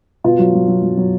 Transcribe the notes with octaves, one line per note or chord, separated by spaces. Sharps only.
B2 F4
F#3
F#3
F#3
F#3
F#3